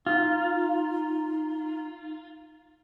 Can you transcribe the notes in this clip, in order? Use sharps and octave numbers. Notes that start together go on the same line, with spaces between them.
D#4 F4